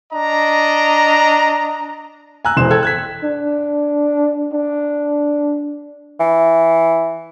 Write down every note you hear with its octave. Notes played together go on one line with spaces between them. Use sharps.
D4 D#5 A#5
G#5 A#5 E6 F#6
E1 E3 C5 C6 E7
A4 G5 E6 G#6
F#6 G#6 B6
D4
D4
E3